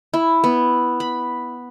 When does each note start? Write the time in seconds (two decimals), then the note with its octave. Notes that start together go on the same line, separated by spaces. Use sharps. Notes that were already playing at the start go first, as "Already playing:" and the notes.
0.14 E4
0.44 B3
1.00 B5